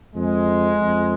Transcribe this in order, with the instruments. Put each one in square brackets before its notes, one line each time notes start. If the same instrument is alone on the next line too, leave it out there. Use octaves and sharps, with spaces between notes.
[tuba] F2 [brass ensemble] G#3
[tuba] F2